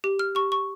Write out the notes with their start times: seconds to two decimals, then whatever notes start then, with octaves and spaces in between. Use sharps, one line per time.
0.04 G4
0.19 F6
0.35 G4 C#6
0.52 C#6